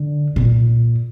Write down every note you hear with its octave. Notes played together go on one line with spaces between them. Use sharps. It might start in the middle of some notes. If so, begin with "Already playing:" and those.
Already playing: D3
A#2